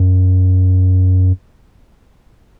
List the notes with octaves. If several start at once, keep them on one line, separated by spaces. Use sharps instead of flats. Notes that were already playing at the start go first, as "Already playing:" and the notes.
Already playing: F#2